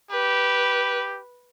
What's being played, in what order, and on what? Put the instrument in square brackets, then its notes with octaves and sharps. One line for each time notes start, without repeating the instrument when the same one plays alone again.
[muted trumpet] G4 [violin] B4